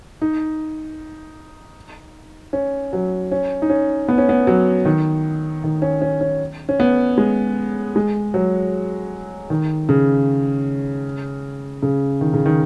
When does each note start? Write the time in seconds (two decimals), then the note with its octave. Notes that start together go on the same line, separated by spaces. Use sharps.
0.22 D#4
2.53 C#4
2.93 F#3
3.31 C#4
3.62 D#4
3.70 C#4
4.08 B3
4.18 C#4
4.29 B3
4.47 F#3
4.85 D#3
5.64 D#3
5.82 C#4
6.02 C#4
6.21 C#4
6.69 C#4
6.80 B3
7.18 G#3
7.96 G#3
8.34 F#3
9.50 D#3
9.89 C#3
11.82 C#3
12.21 D#3
12.34 C#3
12.46 D#3